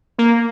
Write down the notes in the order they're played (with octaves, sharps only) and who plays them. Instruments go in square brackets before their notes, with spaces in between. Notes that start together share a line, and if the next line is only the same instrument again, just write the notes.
[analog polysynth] A#3